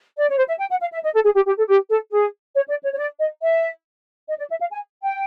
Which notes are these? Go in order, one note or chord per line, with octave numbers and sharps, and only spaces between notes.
D5
C#5
C5
E5
G5
F#5
F5
E5
D#5
A4
G#4
G4
G4
A4
G4
A4
G#4
C#5
D5
C#5
C#5
D5
D#5
E5
D#5
D5
E5
F5
G#5
G5